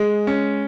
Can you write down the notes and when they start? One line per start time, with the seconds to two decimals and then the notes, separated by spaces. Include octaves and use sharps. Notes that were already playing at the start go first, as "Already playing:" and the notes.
Already playing: G#3
0.27 C#4